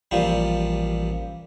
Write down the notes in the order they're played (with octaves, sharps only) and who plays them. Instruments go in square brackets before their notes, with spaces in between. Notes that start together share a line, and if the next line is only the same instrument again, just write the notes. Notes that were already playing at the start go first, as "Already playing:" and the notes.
[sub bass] A1 [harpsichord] A#2 F3 G3